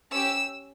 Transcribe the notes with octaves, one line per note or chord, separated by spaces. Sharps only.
C#4 G4 E6